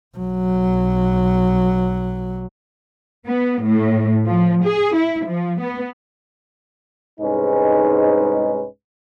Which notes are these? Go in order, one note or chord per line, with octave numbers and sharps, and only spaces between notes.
B1 F#3
B3
A2
F3
G#4
E4
F3
B3
C2 G#2 G#3 C#4 D#4 B4